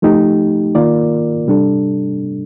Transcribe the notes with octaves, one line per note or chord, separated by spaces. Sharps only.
F3 A3 D#4 G4
D#3 A#3 F4 A#4 D5
C3 G3 D4 A4